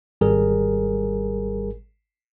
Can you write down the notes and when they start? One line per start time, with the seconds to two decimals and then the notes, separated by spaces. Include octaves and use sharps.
0.21 G#1 G3 G#4 A#4